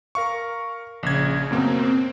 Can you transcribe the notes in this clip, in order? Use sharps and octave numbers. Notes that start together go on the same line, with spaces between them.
A#4 F5 C#6
A#1 C#3 G#6
F#2 B2 A#3 C4